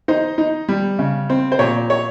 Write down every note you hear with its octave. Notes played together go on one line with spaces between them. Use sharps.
D#4 C5
D#4
G3
C#3
C4
C5
A#2 C#5
C#5